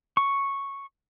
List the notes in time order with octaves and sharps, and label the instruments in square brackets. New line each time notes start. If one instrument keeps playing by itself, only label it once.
[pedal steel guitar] C#6